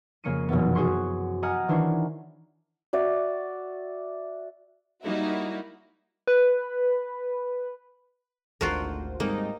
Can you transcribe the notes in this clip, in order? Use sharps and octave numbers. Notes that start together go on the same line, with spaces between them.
F2 C#3 A#3 C#4 C#7 D#7
F1 F#2 B2 E3 B3
F#4 G#4 C5 G#5 C6 C#6
G4 D#5 F#5 G#5 A#5 F6
D#3 E3 D4 E4 C5 C#5
F#4 D5 E5
G3 A#3 D#4 E4 F#4
B4
G#1 D2 D4 F4 F#4 A#4 C5
G#2 G3 A#3 C4 D#4